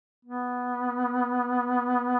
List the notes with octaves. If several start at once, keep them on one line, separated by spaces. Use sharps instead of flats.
B3